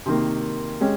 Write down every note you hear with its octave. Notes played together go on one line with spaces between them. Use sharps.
C3 D#3 A#3
G#3 C#4 G4